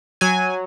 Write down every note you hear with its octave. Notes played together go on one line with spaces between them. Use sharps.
F#3 G#5